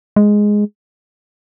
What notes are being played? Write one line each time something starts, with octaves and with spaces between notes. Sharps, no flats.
G#3